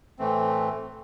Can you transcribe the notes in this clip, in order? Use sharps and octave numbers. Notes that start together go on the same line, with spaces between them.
A2 E3 A3 C4